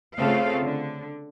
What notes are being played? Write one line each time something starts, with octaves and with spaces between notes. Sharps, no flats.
C#3 A3 C4 F4 A4 F5
D3